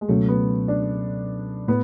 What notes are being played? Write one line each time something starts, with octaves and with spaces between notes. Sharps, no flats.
G#3
C#2 B2 F#3 A3 C#4
B3
D4
A2 B3